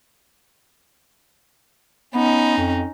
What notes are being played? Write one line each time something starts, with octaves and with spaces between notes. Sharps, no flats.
B3 C#4 D#4
F2